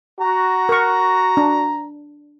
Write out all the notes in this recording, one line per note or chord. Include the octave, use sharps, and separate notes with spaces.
F#4 A#5
A#4 C#6
D4